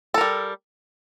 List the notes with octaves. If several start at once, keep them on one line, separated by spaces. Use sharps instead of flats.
G3 A4 A#4